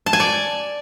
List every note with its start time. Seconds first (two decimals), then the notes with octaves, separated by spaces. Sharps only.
0.06 A5
0.13 G#5
0.20 D5